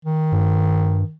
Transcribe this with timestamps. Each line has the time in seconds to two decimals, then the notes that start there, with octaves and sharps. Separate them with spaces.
0.05 D#3
0.32 G2